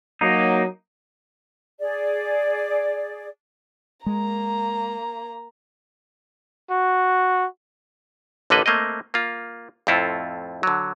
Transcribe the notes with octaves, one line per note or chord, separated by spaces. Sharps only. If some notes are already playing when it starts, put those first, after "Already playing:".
F#3 A#3 D#4
G#4 D5
G#3 A#3 A#5
F#4
A1 D3 A#3 A4 B4 D#5
A3 A#3 C4 D#5
A#3 F4
F2 A2 C4 E4 F4 A4
D3 F#3